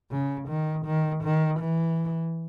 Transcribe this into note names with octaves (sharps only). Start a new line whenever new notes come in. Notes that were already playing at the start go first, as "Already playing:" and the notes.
C#3
D#3
D#3
D#3
E3